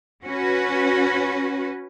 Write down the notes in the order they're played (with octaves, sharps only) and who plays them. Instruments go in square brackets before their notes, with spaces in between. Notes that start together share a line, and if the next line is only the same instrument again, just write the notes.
[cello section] C#4 F#4 B4